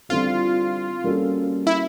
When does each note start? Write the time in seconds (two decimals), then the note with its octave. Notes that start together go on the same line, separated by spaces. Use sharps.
0.09 D3 G3 C4 E4 F4 A4
1.04 G3 A#3 C#4 F#4 A4
1.67 E4